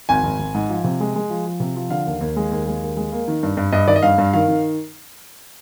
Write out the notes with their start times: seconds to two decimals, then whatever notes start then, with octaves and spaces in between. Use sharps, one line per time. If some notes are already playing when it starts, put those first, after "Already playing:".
0.09 G#1 G#5
0.23 G#1
0.39 G#1
0.54 G#2
0.70 F3
0.84 C3
1.00 G#3
1.16 G#3
1.30 F3
1.46 F3
1.60 C3
1.76 F3
1.90 D3 F5
2.07 D#2
2.21 D#2
2.36 G#3
2.52 D#2
2.67 G#3
2.82 D#2
2.97 G#3
3.12 A#3
3.28 D#3
3.43 G2
3.57 G2
3.72 G2 D#5
3.88 D#3 D5
3.96 D#5
4.02 G2 F5
4.18 G2
4.33 D#3 F5
4.48 D#3